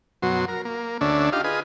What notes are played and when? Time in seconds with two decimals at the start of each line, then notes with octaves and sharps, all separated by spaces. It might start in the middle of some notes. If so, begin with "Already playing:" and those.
0.22 F#2 B2 F#3 C6
0.48 A#4
0.65 A#3
1.01 D2 D3 C#4 D4 E5
1.32 D#4 F4 G4 F5
1.44 F4 G#4 B4 D#5